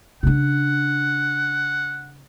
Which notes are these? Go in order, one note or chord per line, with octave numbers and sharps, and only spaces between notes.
C#3 D4 F#5